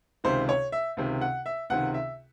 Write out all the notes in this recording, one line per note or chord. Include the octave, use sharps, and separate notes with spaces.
C#2 C3 D#3 C5
C#5
E5
C#2 C3 D#3
F#5
E5
C#2 C3 D#3 F#5
E5